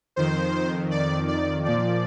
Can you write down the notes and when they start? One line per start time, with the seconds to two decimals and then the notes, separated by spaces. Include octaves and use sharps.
0.16 F2 D#3 C5
0.91 D5
1.28 D5
1.65 A#2 F3 D5